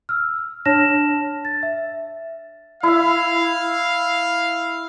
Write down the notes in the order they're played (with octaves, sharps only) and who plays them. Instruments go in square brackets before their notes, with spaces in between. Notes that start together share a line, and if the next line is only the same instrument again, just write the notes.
[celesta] E6 F6
D4 C#5 A5 F6 A#6 E7
A6
E5
[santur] E4 E5 [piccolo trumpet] F5